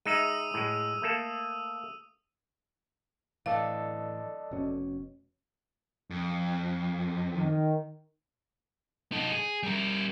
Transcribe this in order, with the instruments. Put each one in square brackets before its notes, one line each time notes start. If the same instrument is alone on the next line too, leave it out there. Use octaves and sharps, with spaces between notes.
[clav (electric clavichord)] G#3 D#4 E5 [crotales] D#6 E6 D#7
[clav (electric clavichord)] A2 G#3
A3 A#3 A4
[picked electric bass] A2 E3 [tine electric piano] A4 D5 D#5 [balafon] F5
[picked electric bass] F1 B2 C#4
[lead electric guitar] F2
[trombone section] D#3
[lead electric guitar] D#4 A4
G#4
G3 A#4